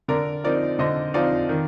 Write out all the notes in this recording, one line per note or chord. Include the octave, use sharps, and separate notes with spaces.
D3 A#4 D5
F3 C4 D#4 A#4 D5
D3 C5 D#5
F3 C4 D#4 D5 F5
D#3